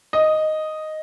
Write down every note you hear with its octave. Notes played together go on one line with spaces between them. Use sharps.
D#5